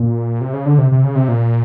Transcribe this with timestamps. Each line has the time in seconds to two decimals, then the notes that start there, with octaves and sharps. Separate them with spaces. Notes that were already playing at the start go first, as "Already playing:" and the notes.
Already playing: A#2
0.41 C3
0.53 C#3
0.66 D3
0.78 C3
0.92 C3
1.04 C#3
1.15 C3
1.28 A#2